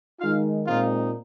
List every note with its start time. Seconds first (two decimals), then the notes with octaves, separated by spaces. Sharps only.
0.20 D#3 G#3 D#4 F4 F5
0.67 A#2 G#3 C4 D#4 F4 F5